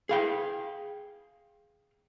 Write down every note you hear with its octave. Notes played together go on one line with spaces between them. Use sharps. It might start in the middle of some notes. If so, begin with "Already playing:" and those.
G#4 F5 G5